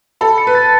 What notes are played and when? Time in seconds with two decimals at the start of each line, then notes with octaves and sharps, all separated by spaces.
0.21 A4 B5
0.38 C#7
0.47 B4
0.55 A6